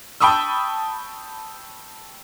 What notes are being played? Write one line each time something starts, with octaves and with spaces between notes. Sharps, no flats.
G5 A5 B5 C#6 D#6 E6